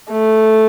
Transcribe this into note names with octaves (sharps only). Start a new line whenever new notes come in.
A3